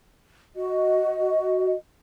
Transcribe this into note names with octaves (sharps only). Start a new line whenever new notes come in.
F#4 D#5